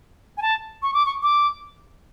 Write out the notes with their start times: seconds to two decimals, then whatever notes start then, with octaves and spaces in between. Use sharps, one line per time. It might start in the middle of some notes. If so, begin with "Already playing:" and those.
0.37 G#5
0.42 A5
0.82 C#6
0.94 D6
1.06 C#6
1.23 D6